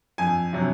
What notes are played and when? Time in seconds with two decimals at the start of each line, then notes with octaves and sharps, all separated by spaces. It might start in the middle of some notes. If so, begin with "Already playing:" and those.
0.18 F2 G#5
0.53 C3 F#3